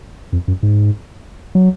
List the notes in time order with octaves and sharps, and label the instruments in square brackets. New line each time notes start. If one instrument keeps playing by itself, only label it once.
[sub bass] F2
F#2
G#2
F#3